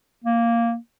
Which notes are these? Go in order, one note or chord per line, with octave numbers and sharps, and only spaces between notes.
A#3